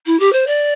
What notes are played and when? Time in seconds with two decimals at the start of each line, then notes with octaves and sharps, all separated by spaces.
0.06 E4
0.19 G4
0.32 C5
0.46 D5